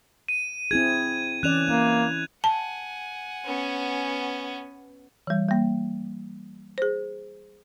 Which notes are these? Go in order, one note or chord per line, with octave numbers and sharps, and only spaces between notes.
D#7
C4 E4 G#4 G#6
E3 C#4 D5 F#6 E7 F7
A#3 E4
F#5 G#5 A5
B3 C#4
E3 G3
G3 A#3
G#4 C5